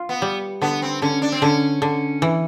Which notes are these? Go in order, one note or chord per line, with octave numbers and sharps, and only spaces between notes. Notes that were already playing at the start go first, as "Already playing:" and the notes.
Already playing: F4
B3
G3
D3 B3
C4
D3 C#4
D4
C4
D3 C#4
D3
E3